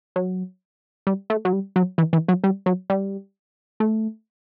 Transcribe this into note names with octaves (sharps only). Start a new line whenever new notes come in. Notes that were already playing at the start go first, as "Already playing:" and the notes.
F#3
G3
A3
F#3
G3
F#3
E3
E3
F#3
G3
F#3
G3
A3